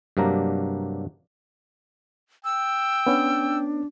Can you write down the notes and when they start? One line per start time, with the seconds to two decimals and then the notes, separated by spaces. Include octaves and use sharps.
0.17 G2 C3 F#3 A#3 D4 A#5
2.45 G5 E6
3.07 B3 C#4 D4